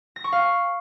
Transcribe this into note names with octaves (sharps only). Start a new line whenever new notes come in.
A#6
C#6
F5